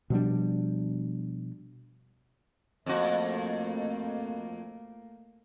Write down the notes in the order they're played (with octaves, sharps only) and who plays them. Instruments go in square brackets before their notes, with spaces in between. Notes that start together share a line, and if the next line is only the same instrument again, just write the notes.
[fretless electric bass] B2 F3 G3 D4
[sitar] F2 F#4 [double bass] A3 A#3